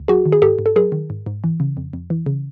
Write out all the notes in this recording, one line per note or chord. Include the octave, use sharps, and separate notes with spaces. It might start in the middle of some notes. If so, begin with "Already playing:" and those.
Already playing: D2
F#3 F#4 G#4
D#3
G#4
G#2 G4 A4
G#2
A4
F#3 G#4 A#4
D#3
G#2
G#2
E3
C#3
F2
F2
E3
C#3